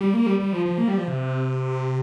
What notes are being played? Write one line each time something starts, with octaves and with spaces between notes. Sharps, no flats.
G3
A#3
G3
G3
F3
F3
A#3
G3
F3
C3